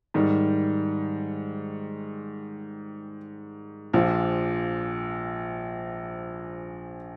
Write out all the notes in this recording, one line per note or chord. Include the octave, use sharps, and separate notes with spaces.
G#2 D#3 G3
A#1 A#2 F3